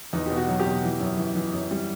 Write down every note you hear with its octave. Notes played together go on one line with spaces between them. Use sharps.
E2 D#4
B2 G4
F#4
F#3
G4
B2
E3
F#2
E3
E3
F#2
G3